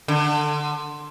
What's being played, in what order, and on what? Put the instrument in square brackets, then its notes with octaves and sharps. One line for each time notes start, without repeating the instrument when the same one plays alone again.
[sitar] D3